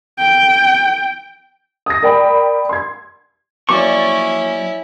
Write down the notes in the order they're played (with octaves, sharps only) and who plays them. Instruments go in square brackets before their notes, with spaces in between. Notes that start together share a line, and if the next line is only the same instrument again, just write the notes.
[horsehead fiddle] G5
[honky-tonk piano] D#6 A#6
A#4 D5 G5 B5
C6 G#6
[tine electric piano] F3 F#3 A#3 [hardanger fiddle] C#4 E4 [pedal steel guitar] D5 C#6 [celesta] D6